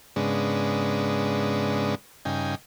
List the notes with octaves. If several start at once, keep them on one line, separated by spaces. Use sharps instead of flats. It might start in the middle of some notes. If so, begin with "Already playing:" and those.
G#2 C#3 G#3 B3 D4
G2 C#3 D#4 G5 G#5